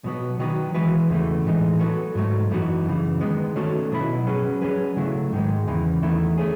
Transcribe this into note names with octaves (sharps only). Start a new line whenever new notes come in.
B2 F#3 B3
D#3 F#3 B3 D#4
E3 G#3 B3 F#4 B4
E2 C#3 E3 A3
A2 E3 G#3 D#4
F#3 B3 F#4 A4
G#2 F#3 A3
F#2 E3 B3 D#4 F#4
F#2 C#3 E3
D#3 G#3 B3
D#3 A3 C#4 F#4 A4
B2 F#3 B3 E4
F#3 C#4 G#4 B4
F#3 C#4 G#4 B4
C#3 F#3 A3 E4
G#2 D#3 G#3
E2 C#3 E3
E2 D#3 A3 E4
A3 C#4 G#4